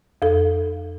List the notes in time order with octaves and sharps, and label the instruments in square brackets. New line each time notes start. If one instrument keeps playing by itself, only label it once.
[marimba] F2 A4